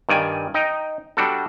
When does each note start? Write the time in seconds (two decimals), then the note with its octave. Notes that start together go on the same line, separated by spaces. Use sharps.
0.09 G2 D#3 D5 G#5
0.54 D#4 G5
1.17 G3 D4 F#4 A4